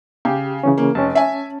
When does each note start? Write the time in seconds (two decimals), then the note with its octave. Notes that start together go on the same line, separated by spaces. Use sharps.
0.25 C#3 G4
0.63 C#3 E3 C#4
0.78 A#3
0.95 F1 C#4 A5
1.15 E5 G#5